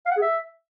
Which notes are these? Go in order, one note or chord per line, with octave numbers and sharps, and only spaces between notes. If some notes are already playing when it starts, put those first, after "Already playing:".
F5
F#5
G#4
E5